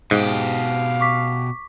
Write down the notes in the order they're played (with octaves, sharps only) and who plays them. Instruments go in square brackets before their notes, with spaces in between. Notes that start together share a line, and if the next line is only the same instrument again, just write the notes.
[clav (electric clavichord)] G#2 [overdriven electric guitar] B2 G4 [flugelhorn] F5
[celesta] C#6 D6 B6